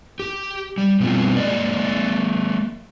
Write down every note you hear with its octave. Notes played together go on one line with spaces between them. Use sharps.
G4
G3
B2 G3 B3 C4 F4
G#3 A#3 D5 D#5